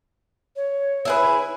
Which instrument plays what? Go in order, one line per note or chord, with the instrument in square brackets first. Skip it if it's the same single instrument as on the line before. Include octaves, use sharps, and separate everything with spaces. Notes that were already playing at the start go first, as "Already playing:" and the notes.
[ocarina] C#5
[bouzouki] E4 G#4 B4